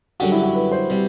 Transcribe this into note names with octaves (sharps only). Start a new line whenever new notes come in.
F#2 D3 G3 D4 F#4 G4
E4
F#4
B4
C5
C3 G3